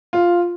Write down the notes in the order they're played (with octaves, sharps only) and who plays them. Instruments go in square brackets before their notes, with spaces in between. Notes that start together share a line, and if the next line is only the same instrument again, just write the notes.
[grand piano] F4